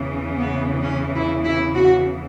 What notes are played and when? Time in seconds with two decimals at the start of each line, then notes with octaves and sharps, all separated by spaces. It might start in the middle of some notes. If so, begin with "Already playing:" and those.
Already playing: E2 C#3 E3
0.38 B3
0.83 C#4
1.14 E4
1.44 E4
1.75 F#4